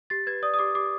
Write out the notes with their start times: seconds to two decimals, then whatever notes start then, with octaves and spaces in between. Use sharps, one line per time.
0.10 G4 A6
0.27 B4 G#6
0.43 D5 D#6
0.54 D#6
0.59 G4 D6
0.75 G4 D6